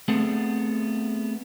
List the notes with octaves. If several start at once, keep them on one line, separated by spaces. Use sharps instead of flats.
A3 B3 C4 G#4 A4 F#5